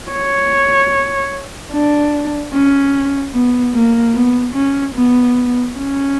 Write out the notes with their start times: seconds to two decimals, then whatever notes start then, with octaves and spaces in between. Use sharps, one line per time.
0.11 C#5
1.73 D4
2.54 C#4
3.34 B3
3.74 A#3
4.15 B3
4.55 C#4
4.95 B3
5.76 C#4